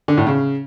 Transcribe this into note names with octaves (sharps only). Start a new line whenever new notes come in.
D3
A2
C#3